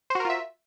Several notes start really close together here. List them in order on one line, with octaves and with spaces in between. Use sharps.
C5 F#4 A#4 F4 E5